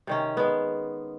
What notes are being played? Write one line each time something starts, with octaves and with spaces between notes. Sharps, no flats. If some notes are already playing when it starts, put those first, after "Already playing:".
C3 D#3 C#4
G#3 B3